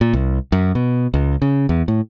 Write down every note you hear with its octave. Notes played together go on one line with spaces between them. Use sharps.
A#2
C2
F#2
B2
C#2
C#3
E2
A2